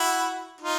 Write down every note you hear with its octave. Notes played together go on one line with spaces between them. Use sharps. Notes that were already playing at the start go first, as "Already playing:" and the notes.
Already playing: E4 F#4
D#4 F4